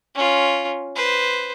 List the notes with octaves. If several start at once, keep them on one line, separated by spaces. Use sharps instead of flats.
C#4 F4
B4 C5